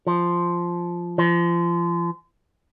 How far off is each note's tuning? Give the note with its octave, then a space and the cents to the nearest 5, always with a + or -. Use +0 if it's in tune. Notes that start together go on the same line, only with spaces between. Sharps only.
F3 -5
F3 -30